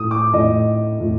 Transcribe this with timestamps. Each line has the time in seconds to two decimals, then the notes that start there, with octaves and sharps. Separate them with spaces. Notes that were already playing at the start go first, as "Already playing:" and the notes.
Already playing: A2 D#6
0.11 D6
0.33 A2 D#5
1.00 A2